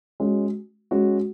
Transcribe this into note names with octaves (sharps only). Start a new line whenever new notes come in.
G#3 C#4 F#4
G#3 C#4 F#4